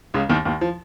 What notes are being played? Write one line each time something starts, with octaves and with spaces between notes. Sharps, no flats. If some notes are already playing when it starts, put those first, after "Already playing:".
C#2 C#3
D#2 D#3
D#2 D#3
F3